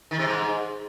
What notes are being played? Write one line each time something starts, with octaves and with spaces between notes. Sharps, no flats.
D#3
C3
G#2